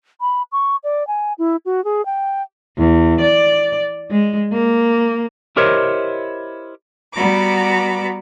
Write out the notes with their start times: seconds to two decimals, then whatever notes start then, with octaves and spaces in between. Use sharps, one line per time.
0.21 B5
0.52 C#6
0.84 D5
1.07 G#5
1.39 E4
1.66 F#4
1.85 G#4
2.06 G5
2.78 E2
3.21 D5
4.10 G#3
4.53 A#3
5.56 E4 G4 A#4 C5 C#5 D#5
7.13 G3 B3 F#4 A#5 B5 D6